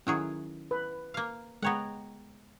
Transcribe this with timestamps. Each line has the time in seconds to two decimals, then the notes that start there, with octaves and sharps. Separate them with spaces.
0.07 D#3 F#3 C#4 E4 G#4
0.71 B4
1.14 A#3 F5
1.62 G#3 B3 C#5 F#5 G5 A#5